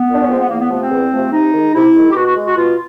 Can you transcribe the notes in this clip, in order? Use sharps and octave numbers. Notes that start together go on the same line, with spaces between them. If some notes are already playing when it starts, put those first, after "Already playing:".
Already playing: B3
A#2
D4
C#4
F3 G#3 C4
B3
E2 A#3
B3
C3 F3 A3 B3
C4
E2
C3 F3 A3
C3 D#4
D#3 G#3
C3 E4
D#3 G#3
G4
B2 F#4
F#4
G#3
F#4
B2 F4